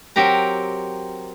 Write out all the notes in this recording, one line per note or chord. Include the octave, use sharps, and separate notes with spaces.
F#3 C4 G4 A#4 A#5